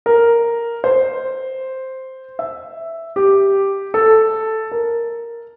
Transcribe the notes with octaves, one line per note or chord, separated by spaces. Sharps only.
A#4
C5
E5
G4
A4
A#4